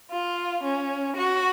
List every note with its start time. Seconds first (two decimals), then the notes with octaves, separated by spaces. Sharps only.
0.11 F4
0.64 C#4
1.15 F#4